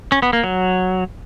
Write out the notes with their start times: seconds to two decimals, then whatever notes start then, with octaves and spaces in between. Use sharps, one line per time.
0.12 C#4
0.22 B3
0.33 A#3
0.44 F#3